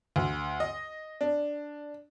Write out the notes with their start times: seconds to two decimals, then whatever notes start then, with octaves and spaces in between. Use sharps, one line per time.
0.16 D2
0.60 D#5
1.21 D4